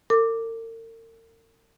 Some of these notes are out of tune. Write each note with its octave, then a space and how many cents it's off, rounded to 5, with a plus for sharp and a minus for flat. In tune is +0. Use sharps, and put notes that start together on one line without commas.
A#4 -45 D6 +0